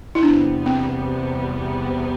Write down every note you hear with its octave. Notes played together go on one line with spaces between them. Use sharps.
E4
E2 C3 G3 B3 D4
C4